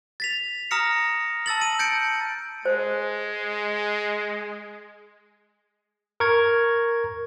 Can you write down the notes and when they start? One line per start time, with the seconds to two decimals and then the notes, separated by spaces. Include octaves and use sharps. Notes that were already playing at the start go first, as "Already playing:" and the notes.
0.20 A6 B6 F7
0.71 A#5 D#6 F6 A#6 C#7
1.46 A5 E6 A6 F#7
1.62 D#7
1.79 G6 A6 C#7 D7
2.65 G#3 C5
6.20 A#4 C#6 G#6